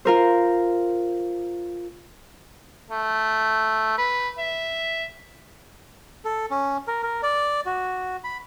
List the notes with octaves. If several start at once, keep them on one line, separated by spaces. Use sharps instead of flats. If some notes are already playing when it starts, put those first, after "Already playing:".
F4 A#4 C5
A3
B4
E5
A4
C#4
A#4
A#4
D5
F#4
B5